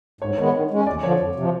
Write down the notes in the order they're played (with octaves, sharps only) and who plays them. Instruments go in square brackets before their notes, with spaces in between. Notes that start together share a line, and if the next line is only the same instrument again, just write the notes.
[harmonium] G#2 [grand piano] C#5
[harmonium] D#3 G#3 B3 [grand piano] C#5
[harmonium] D#3
G#3 C#4
[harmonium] D#2 [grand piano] D5
[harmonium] D3 F3 [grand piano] C#5
[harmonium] F2
C3 F3